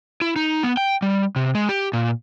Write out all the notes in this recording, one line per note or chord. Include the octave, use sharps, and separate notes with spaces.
E4
D#4
B3
G5
G3
C3
G#3
G4
A#2